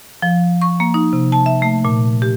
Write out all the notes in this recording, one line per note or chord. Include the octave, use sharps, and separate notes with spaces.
F3
C#6
A#3
D#4
C3
A5
E5
A3
A#2
G4